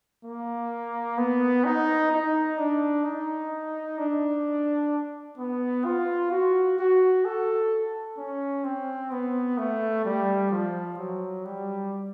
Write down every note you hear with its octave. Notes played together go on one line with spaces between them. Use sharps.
A#3
B3
D#4
D#4
D4
D#4
D4
B3
F4
F#4
F#4
A4
C#4
C4
B3
A3
G3
F3
F#3
G3